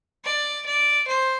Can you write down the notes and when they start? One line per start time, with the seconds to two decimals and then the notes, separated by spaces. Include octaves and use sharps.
0.25 D5
0.66 D5
1.07 C5